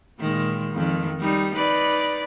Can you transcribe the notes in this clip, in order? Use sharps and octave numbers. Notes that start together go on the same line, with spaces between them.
A#2 D#3 G#3
F2 D#3
G3 D#4
D#4 B4 D5